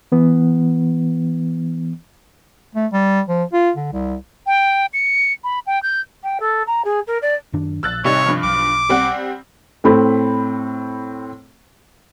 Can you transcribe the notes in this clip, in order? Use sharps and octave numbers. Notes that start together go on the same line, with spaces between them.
E3 B3
A3
G3
F3
F4
D3
C2
G5
C#7
B5
G5
G6
G5
A4
A#5
G#4
A#4
D5
F#2 D#3 D4
A#1 E6 F#6 A6
A1 C3 G3 D#4 C#5
G2 F3
B1 D6
G3 C4 F#5
A2 A3 C4 B5